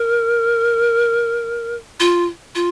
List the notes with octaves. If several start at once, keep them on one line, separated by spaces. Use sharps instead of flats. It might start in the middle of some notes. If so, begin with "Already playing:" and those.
Already playing: A#4
F4
F4